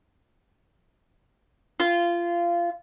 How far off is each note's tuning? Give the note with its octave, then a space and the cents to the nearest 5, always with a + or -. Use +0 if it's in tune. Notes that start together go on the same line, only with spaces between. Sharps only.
F4 -20